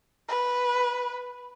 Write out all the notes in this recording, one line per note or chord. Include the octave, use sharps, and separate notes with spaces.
B4